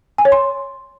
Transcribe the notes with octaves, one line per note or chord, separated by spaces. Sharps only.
G#5
C#5
C6